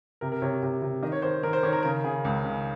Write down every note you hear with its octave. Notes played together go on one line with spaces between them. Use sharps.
C3 A#4
A#4
C3 C#5
C3
C3
D#3 D#5
C#5
D#3 C5
D#3 A#4
C5
D#3 C#5
A#4
C#3 A#4
C#3 G#4
C#2
C#3